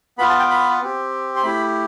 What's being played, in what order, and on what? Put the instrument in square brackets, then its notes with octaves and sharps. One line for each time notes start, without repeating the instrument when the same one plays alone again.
[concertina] B3 F4 B5
A5
G5
B5
C4 G4
C6
A3 E4 G4 B5